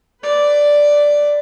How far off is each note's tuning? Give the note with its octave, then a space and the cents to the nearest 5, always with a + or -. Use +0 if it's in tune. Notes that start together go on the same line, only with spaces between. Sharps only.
B4 +25 D5 +0